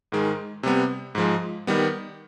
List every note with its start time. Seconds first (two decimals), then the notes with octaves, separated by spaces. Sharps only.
0.12 G#2 D#3 G#3
0.63 C3 G3 B3
1.15 G#2 F3 G#3
1.67 D#3 G3 B3